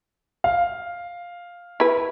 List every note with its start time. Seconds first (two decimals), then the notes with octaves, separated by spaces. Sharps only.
0.44 F5
1.80 E4 B4